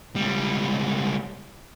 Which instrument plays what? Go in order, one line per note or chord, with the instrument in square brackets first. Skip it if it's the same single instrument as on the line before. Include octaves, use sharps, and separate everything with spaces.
[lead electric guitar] C#2 G3